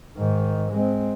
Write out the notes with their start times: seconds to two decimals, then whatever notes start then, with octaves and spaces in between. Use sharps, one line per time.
0.18 G#2 D#3
0.72 G#3 C4